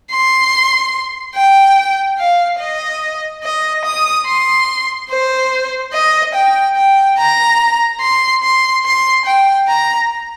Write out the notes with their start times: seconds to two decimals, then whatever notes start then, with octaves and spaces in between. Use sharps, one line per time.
0.11 C6
1.35 G5
2.19 F5
2.60 D#5
3.44 D#5
3.85 D#6
4.27 C6
5.10 C5
5.93 D#5
6.35 G5
6.77 G5
7.18 A#5
8.01 C6
8.43 C6
8.85 C6
9.26 G5
9.68 A#5